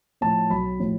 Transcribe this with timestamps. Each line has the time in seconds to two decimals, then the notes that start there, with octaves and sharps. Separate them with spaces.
0.21 A2 F3 A5
0.50 B1 B5
0.80 A2 F3